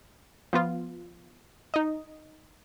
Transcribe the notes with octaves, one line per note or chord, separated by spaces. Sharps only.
F3 B3 F4
D#4 D#5